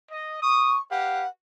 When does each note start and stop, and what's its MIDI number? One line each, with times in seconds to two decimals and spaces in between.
0.10 0.41 75
0.42 0.80 85
0.42 0.75 87
0.90 1.26 67
0.90 1.26 71
0.90 1.26 77
0.90 1.26 78